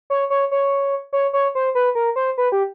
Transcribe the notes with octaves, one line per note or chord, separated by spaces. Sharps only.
C#5
C#5
C#5
C#5
C#5
C5
B4
A#4
C5
B4
G4